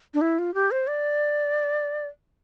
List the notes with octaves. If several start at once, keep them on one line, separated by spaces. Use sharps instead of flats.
D4
E4
F4
G4
C5
D5